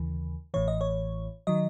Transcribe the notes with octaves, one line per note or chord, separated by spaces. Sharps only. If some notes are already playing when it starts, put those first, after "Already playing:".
Already playing: D#2 C#3 E3
A1 A2 E3 C#5
D#5
C#5
D#3 F#3 D#5